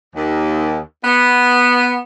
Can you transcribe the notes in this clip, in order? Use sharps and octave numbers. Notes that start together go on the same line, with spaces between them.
D#2
B3